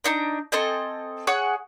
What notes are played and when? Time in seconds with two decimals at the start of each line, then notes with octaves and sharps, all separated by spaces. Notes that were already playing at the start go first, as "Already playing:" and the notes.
0.04 D4 D#4 A#5
0.52 C4 A4 D#5 G#5
1.27 G#4 C#5 F#5 C#6